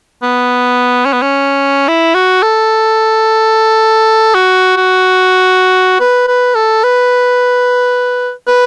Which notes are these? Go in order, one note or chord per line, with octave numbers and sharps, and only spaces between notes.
B3
C#4
B3
C#4
E4
F#4
A4
F#4
F#4
B4
B4
A4
B4
B4